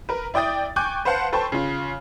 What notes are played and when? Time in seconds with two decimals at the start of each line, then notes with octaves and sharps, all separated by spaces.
0.09 A#4 B4
0.34 E4 D5 G5 D#6 A6
0.76 G5 G#5 C#6 D6 F#6 G6
1.05 B4 C5 F5 F#5 A5
1.33 A4 B4 C5 G5 A5 C#6
1.52 C#3 F4